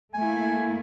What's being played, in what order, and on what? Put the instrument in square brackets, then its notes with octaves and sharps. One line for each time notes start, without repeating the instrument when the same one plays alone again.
[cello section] A3 A#3 E4 [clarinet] G#5